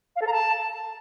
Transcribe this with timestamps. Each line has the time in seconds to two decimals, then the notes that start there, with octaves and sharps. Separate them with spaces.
0.16 F5
0.21 A4
0.27 A#5
0.33 A5